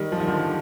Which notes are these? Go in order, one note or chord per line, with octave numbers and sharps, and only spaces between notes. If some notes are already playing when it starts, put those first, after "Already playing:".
Already playing: D#3 G3
F3
D#3
D3 F3